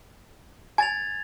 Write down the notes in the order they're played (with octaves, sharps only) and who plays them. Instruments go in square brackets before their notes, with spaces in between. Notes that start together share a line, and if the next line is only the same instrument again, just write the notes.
[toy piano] G#5 [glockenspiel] G#6 A6 F7